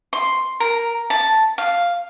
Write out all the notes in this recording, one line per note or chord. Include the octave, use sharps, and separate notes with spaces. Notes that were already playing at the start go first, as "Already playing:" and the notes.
C6
A#4
A5
F5